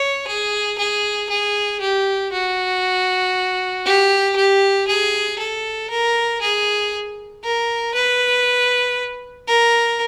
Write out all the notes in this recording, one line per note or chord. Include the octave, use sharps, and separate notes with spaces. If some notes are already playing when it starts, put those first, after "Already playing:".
Already playing: C#5
G#4
G#4
G#4
G4
F#4
G4
G4
G#4
A4
A#4
G#4
A#4
B4
A#4